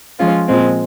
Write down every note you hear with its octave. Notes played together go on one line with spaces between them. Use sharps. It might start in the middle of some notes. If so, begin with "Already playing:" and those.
F3 G#3 C#4 F4
A#2 F3 G#3 C4